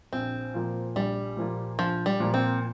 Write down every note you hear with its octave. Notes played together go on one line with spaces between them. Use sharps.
A#1 C4
A#2 F3 A#3 F4
A#1 G3
A#2 F3 A#3 F4
A#1 F3
G3
A#2 F3 A#3 F4
C4